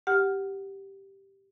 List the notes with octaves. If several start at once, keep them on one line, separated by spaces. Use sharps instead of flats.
G4 F#5 F6